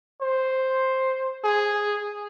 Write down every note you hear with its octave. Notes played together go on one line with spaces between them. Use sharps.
C5
G#4